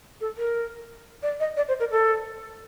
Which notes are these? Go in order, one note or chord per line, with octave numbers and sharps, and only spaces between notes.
A4
A#4
D5
D#5
D5
C5
A#4
A4